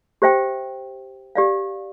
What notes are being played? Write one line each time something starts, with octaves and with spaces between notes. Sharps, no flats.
G4 C5 E5 G5
G4 D5 F5